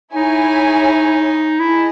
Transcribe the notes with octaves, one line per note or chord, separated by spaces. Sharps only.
D#4 E4 G#4 C#5 G#5
E4 G#4 D#5 A5